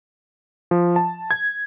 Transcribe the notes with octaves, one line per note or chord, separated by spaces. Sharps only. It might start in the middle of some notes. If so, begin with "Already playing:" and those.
F3
A5
G#6